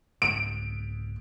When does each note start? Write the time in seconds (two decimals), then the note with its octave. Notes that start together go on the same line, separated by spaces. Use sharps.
0.22 C2 G#2 G#3 D7